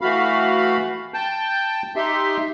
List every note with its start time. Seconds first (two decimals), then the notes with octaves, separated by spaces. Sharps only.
0.01 E3 A3 F#4 F5 B5
1.14 G5 A5 G6
1.96 D#4 G4 E5 C6